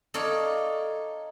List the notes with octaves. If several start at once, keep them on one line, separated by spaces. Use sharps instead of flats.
D#4 A4 C#5 D5 F5